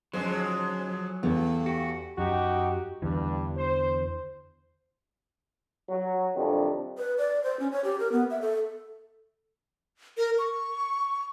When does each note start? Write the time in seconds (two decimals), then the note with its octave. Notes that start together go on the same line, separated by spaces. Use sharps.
0.13 F2 D3 F#3 G#3 C#4 D#4 C5
1.23 E2 G2 A3
1.66 F#4 G4
2.18 F#2 D#4 F#4 G4
3.02 E2 G2 D3 E3
3.57 C5
5.89 F#3
6.36 F2 C3 D#3 G3 D4
6.98 B4
7.18 D5
7.44 C5
7.60 C#4
7.72 C#5
7.84 G4
8.00 A#4
8.12 B3
8.30 E5
8.42 A4
10.18 A#4
10.39 C#6